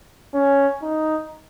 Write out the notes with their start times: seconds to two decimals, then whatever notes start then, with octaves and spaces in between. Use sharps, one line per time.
0.34 C#4
0.82 D#4